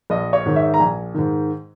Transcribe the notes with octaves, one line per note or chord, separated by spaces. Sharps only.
A#1 D#5
C#5
G#2 D#3
E5
A#5
A#1 G#5
G#2 D#3